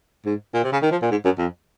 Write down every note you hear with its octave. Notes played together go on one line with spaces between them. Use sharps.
G#2
A#2
C3
C#3
D#3
F3
A#2
G#2
F#2
F2